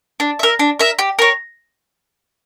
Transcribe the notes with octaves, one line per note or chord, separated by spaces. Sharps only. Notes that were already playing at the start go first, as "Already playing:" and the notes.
D4
A#4 E5
D4
A#4 E5
G4
A#4 C#5